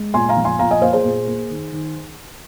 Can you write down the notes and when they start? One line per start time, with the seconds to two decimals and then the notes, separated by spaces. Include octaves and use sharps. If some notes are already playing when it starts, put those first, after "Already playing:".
Already playing: G#3
0.14 A#2 G#5 C6
0.29 F5 A#5
0.37 F3
0.45 G#5 C6
0.59 A#2 F5 A#5
0.71 D#5 G#5
0.82 A#3 C5 F5
0.93 G#4 C5
1.04 A#2
1.27 A#3
1.50 D#3
1.72 D#3